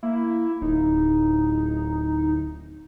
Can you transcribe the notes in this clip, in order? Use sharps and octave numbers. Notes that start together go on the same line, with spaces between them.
A#3 E4
D1 D#4